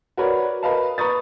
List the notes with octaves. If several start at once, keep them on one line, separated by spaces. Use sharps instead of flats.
F#4 A#4 B4 C#5 D5
A#4 B4 D#5 F5 A5
B4 A#5 C#6 D#6 A6